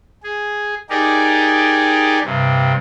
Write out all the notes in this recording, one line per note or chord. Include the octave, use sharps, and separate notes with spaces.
G#4
D#4 G4 G#4 A#4 D5
G2 C3